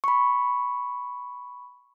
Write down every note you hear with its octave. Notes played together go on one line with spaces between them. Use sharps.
B5 C#6